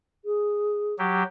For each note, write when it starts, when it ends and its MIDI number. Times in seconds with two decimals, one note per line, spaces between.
0.25 0.94 68
0.99 1.23 54
0.99 1.23 67